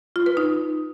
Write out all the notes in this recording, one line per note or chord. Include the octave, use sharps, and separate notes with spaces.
F4
B4
D#4